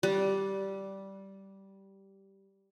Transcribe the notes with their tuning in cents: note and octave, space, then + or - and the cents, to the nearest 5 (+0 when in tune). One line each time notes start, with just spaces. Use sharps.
G3 -10